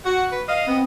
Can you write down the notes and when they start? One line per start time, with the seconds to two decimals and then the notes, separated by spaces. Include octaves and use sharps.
0.05 F#4 F#5
0.32 B4
0.48 D#5 F5
0.67 B3 C4